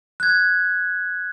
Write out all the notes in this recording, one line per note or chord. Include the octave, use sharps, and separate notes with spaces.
F#6 G#6